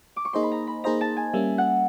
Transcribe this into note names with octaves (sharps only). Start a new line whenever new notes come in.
D6
C#6
A#3 D#4 G#4 C5 D#5 C6
B5
A#5
B5
A#3 D#4 G#4 C5 D#5 A#5
A5
G#5
G3 A#3 C#4 E5
F#5